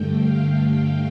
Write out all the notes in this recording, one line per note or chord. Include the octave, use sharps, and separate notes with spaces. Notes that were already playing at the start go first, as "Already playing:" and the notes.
Already playing: G2 D3 A3 G5
F5